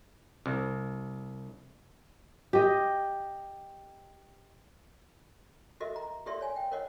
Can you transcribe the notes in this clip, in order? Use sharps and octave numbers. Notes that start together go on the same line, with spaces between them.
C2
G4 D#5
F#4 A4 A#4 D#5 E5
A#5
G4 A4 A#4 D5 E5 C6
C#5 G#5
G5
A#4 C#5 D#5 F#5